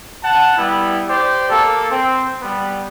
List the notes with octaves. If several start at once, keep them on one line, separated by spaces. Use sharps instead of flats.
F#5 A5
G3 B3 E4
G4 C5 D5
A#3 A4
C4
G3 B3